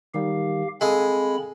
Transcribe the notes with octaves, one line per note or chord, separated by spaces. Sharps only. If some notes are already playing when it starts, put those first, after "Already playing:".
D#3 G3 G4 F5
G#3 C4 A4 F5 G#5 B5